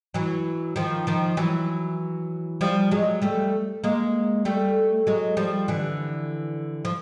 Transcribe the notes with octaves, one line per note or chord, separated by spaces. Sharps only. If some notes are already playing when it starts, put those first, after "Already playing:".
E3 F#3
D#3 F3
D#3 F3
E3 F#3
F3 G3
F#3 G#3
G3 A3
G#3 A#3
G3 A3
F#3 G#3
F3 G3
D3 E3
F3